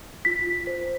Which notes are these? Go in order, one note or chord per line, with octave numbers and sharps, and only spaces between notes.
F4 B6
F4
C5